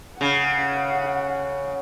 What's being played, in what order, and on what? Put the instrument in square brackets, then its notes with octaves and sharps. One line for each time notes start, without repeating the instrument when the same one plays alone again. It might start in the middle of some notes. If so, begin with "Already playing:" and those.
[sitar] C#3 [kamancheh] F#5